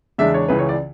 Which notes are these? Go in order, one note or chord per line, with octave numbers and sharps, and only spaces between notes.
E2 C#3 G#3 D4 E5
C#5
C#2 C#3 E3 B4
C#5
D5